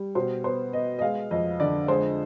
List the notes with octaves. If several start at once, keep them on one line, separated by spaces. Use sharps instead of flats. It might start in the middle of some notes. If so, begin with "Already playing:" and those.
Already playing: G3
B2 C5
B3 C5
B3 D#5
D#5
G#3 F5
F2 D#5
D3 D5
G#3 C5